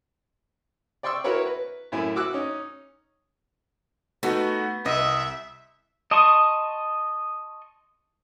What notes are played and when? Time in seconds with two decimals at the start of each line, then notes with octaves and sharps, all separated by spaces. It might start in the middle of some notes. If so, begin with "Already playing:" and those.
1.03 D5 G5 C6 C#6 E6
1.24 E4 F#4 A#4 B4 C#5
1.46 B4
1.92 F#2 A2 E4 G#5
2.16 F#4 D6 E6 F#6
2.33 C#4 D#4
4.23 A3 B3 D#4 F#4
4.86 C2 D#5 E5
6.11 D#5 A5 C6 C#6 D#6